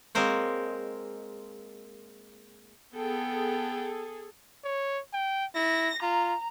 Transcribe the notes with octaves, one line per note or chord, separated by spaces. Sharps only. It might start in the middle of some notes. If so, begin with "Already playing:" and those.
G#3 A#3 C4 A#4 C5 C#5
B3 G#4 A4 G5
C#5
G5
E4 A#6
F4 A#5